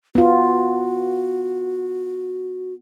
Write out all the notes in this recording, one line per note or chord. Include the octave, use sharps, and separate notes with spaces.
B3 F4 F#4